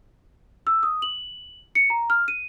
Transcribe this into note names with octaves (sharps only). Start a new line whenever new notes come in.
E6
D#6
F#7
C#7
A#5
F6
D#7